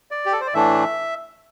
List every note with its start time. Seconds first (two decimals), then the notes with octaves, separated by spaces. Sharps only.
0.11 D5
0.26 G4
0.33 A4
0.40 C5
0.47 D5
0.54 A2 E3 A3 D4 E5